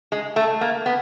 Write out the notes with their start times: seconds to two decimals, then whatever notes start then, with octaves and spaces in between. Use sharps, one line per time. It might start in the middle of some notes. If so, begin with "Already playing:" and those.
0.12 G#3
0.36 A3
0.61 A#3
0.86 B3